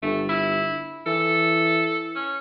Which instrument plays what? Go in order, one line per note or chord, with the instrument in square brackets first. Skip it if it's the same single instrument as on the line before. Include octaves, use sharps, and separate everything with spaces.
[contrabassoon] G1 [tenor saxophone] A3
[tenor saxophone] E4
[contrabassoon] E3 [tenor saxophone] A4
[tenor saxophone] C#4